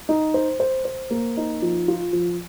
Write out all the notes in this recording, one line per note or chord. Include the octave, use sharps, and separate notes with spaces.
D#4
C5
C5
C5
A#3
D#4
F3
F4
F3